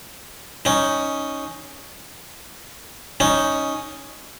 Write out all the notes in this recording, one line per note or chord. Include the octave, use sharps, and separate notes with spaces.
C#4 D#4
C#4 D#4